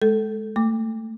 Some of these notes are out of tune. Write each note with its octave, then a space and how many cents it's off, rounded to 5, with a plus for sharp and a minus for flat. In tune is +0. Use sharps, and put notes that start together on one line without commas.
G#3 +25 A4 +0
A3 +25 D6 +0